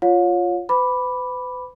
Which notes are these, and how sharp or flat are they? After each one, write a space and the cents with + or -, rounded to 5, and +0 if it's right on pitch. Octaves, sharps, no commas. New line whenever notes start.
F4 +0 C#5 +0 F5 +45
B4 +40 B5 +0 D6 +0